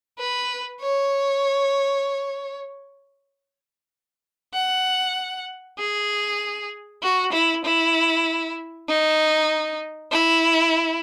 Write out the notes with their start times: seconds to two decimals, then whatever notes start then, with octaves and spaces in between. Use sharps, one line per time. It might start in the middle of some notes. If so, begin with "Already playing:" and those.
0.19 B4
0.82 C#5
4.54 F#5
5.79 G#4
7.03 F#4
7.33 E4
7.65 E4
8.89 D#4
10.12 E4